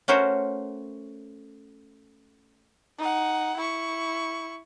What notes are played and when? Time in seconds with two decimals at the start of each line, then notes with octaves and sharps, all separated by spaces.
0.08 A3 C#4 F#4 A#4 C5 C#5
2.98 D#4 F#5
3.57 E4 C#6